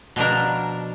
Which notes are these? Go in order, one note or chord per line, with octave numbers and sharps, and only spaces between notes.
B2 F3 D4 A#4